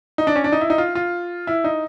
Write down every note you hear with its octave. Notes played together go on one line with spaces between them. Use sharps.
D#4
D4
C#4
D4
D#4
E4
D#4
F4
F4
E4
D#4